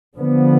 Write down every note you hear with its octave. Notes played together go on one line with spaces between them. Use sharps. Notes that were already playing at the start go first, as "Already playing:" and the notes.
D3 F3 B3